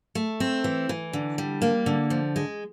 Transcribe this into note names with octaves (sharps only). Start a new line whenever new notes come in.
A3
C4
E3
E3
D3
G3
A#3
D3
F3
G#3